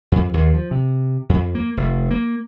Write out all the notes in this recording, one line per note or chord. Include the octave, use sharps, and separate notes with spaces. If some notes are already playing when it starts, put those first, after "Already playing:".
F2
D#2
F3
C3
F2
A#3
F1
A#3